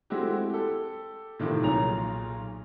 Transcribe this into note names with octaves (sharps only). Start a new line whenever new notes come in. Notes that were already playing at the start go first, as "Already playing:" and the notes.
G#3 A3 C4 E4 F#4 G4
G4 A4
A2 C3 D#3 F3
B1 A#2 G#4 C#5 A#5 F7